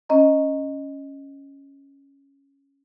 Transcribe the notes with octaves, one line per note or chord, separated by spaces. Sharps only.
C#4 D#5 A#5